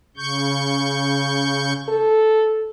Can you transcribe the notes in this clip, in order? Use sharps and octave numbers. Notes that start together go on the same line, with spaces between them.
C#3 C#6 G6
A4